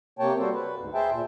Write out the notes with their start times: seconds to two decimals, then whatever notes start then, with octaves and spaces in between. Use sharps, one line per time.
0.19 C3 A#3 C#5 G5 A5
0.38 G3 F#4 A4 C5
0.54 B4
0.79 D2 G#2
0.94 G#4 C5 E5 G5 A5
1.11 A#2